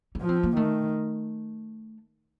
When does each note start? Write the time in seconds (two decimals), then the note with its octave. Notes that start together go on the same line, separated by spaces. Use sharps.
0.15 C#4
0.21 F3
0.29 C4
0.43 A#3
0.57 D#3 A3